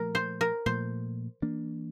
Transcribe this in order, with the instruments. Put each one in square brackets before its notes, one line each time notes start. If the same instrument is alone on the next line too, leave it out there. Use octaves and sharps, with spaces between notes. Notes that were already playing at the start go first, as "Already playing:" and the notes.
Already playing: [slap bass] A#2 F3 A3 [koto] A#4
[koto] C5
A#4
[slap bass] A#2 F3 A3 [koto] C5
[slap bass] E3 A#3 D4